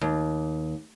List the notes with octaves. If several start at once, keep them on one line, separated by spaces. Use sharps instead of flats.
D#2